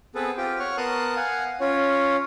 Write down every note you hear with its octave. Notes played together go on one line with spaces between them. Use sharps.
B3 C4 G#4 A4 B4
C4 F4 G4 G5
C#5 F#5 C#6 F6
B3 A#4 A5 C6 D#6 F#6
F5 F#5 G#5
C#4 F4 C#5